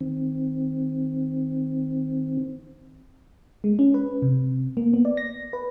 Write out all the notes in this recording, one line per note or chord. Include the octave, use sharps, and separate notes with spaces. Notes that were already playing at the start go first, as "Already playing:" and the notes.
D#3 C4
G#3
C#4
B4
C3
A#3
B3
D5
A#6
B4